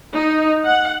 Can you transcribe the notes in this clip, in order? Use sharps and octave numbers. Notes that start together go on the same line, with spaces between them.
D#4
F#5